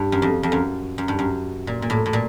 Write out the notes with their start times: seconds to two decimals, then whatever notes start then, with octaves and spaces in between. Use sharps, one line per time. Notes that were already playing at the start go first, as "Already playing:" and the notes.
Already playing: G2
0.12 F#2
0.22 F2
0.43 F2
0.52 F#2
0.98 F#2
1.08 G2
1.19 F#2
1.67 A#2
1.82 A#2
1.90 A2
2.06 A2
2.13 A#2